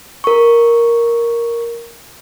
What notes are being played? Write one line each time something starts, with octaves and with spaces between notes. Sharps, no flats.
A#4 C#6